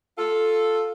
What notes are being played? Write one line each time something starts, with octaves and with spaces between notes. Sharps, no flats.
F4 A4